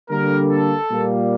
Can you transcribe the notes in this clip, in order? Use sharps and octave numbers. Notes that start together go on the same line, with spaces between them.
D3 G3 A#3 A#4
A4
A#2 G3 A#3